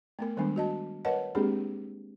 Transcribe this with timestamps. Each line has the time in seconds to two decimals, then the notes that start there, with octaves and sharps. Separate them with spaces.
0.19 A3 B3 A#4
0.37 D#3 G3 G#3 B3 D4
0.56 F#4 D#5 A5
1.05 A#4 B4 C#5 D#5 F#5 A5
1.35 G#3 A#3 C4 D4 G4 G#4